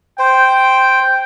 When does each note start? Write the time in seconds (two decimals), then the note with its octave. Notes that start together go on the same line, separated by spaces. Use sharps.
0.19 C5 G5